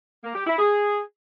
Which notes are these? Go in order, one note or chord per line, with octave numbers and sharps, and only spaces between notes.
A#3
G4
E4
G#4